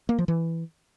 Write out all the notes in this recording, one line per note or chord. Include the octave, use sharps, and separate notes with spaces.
A#3
F3
E3